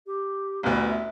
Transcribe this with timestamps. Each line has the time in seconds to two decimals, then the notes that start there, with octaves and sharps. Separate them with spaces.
0.06 G4
0.63 A1 D2 B3
0.90 E5